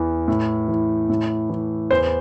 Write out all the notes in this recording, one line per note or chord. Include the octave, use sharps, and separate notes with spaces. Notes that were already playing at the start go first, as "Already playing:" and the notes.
Already playing: E2 E3
A2
E3
A2
E3
E2 C5